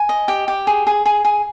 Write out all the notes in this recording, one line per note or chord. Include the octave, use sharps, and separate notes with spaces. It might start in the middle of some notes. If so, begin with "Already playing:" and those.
Already playing: G#5
D#5
G4
G4
G#4
G#4
G#4
G#4